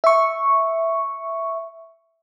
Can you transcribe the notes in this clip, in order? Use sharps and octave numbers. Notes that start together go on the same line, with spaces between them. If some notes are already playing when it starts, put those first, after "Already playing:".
E5 C#6